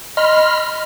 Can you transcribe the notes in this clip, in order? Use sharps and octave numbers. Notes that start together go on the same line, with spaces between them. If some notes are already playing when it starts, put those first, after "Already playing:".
D#5 B5 C6 F6